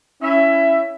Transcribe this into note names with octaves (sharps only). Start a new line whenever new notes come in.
C#4 E4 E5